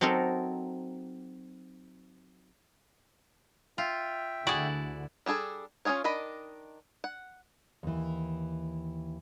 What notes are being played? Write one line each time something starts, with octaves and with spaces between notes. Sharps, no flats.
F#3 C4 D#4 A4 A#4
F4 E5 G5
D2 D3 E4 F#4 G#4 D5 F#5
G3 D4 G#4 A4
C#4 E4 F4 G#4 C#5
D#3 D4 D#5 B5
F#5
D#2 E3